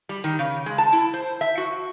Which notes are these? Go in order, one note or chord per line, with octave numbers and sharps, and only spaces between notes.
G3
D#3
C#3
G#3
A5
E4
C5
E5
F#4